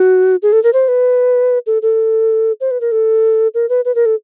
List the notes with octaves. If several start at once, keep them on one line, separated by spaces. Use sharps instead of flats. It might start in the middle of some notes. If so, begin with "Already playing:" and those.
Already playing: F#4
G#4
A4
A#4
C5
B4
A4
A4
C5
B4
A#4
A4
A#4
B4
B4
A#4
A4